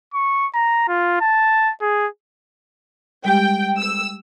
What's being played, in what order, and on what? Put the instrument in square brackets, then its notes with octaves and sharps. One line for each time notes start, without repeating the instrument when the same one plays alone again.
[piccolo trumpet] C#6
A#5
F4
A5
G#4
[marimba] G3 G#3 G4 [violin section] G5
[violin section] E6